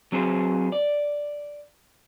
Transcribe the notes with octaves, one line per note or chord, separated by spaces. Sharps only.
F#3 C4 G#4 C5
D5